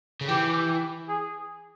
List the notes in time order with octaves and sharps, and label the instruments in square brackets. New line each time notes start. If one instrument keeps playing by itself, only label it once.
[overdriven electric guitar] C#3
[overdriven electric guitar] E3 [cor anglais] G4
[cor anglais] G#4